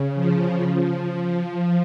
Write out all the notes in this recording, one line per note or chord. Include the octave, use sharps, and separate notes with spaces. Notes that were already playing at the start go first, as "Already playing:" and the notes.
Already playing: C#3
F3
F3